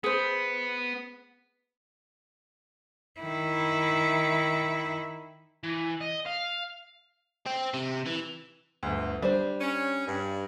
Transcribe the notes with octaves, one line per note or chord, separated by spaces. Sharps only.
B3 G#4 C5
D#3 E4
E3
D#5
F5
C4
C3
E3
G1 D2
G3 D4 C5
C#4
G2